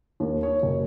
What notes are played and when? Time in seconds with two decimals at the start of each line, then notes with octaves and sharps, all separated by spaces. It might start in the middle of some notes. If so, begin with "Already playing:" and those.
0.20 D#2
0.43 C#5
0.63 F#1